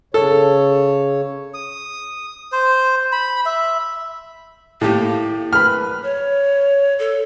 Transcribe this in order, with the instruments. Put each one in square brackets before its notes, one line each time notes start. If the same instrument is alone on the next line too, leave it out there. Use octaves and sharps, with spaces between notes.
[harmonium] C#3 C#5 [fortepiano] A4
[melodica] D#6
C5
B5
E5
[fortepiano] A2 G4 [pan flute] A#3
[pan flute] B4 [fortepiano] B5 F6
[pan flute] C#5
A4